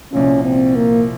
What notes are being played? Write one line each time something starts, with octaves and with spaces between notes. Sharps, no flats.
C2 A#2 F3 C#4
C4
A#3